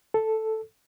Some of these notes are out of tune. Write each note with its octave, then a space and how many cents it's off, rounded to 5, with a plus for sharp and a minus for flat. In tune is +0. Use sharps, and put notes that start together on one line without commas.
A4 +0